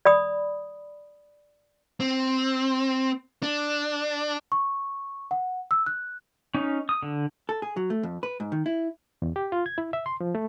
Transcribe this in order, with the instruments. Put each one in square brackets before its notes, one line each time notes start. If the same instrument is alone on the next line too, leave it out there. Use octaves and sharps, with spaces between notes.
[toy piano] D5 B5 D#6
[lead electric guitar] C4
D4
[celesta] C#6
F#5
E6
F#6
[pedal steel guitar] C#4 D#4
D#6
D3
[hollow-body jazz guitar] A4
G#4
F#3
A3
F2
B4
G#2
D#3
E4
[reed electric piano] E2
G4
F4
G#6
E4
E5
C6
F3
A3